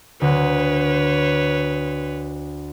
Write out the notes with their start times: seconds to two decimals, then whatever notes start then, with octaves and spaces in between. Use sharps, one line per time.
0.21 D2 B4 C#5